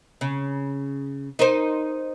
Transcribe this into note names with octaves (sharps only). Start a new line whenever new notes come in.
C#3
D#4 A#4 C5